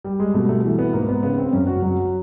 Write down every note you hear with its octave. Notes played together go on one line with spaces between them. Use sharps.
G3
G#3
B2 A3
A3
E3
B3
G#2 A#3
B3
C#3 B3
C4
F#2 C#4
F#4
F#3 F#4